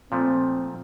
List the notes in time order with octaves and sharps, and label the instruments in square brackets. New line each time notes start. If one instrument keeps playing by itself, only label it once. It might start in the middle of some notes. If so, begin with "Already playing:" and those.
[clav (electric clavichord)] A#2 F3 A3 [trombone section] C4